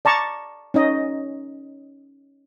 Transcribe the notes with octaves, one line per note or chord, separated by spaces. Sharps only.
D5 A5 A#5 C#6
C#4 D#4 D#5